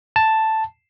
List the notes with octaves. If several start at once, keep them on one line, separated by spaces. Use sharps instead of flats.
A5